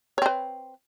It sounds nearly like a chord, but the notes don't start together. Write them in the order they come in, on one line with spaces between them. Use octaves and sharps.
C#5 C4 B4